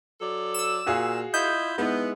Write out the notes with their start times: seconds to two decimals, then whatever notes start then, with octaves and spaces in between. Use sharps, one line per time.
0.20 F#3 A4 D5
0.54 E6 E7
0.86 A#2 F#4 G#4 F5
1.34 E4 F4 D#5 G6
1.78 G#3 B3 D#4 E4